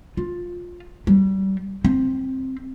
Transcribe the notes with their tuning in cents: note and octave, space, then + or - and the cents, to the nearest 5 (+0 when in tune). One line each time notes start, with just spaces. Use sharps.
F4 +10
G3 -30
C4 +5